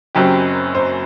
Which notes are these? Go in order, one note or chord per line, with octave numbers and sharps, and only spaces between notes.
F#1 F#2 F#3 C4 G4
C5